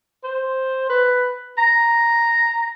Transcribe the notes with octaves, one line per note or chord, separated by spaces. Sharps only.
C5
B4
A#5